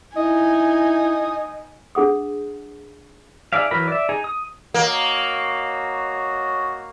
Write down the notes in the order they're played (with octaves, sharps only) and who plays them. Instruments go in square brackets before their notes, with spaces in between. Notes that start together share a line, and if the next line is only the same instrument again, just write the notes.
[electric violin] D#4 G#5 [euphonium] E4 [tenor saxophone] D#5
[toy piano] D4 G#4 F#5 D#6
[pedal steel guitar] D#4 G#4 D5 E5 F5
E3 F#3 A#4 B5
D5 E5
D#4 G#4
D#6
[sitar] A#3 [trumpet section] F#4 C#5 D#5